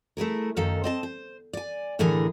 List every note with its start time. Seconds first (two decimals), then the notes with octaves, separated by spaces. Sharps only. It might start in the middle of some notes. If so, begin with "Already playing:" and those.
0.17 A3 E4 G#4 A#4
0.57 F#2 D#3 A4 D#5 F5
0.84 C4 D#5 A5
1.03 C5
1.53 D5 G#5
1.99 A2 D3 E3 G#4 A#4 G#5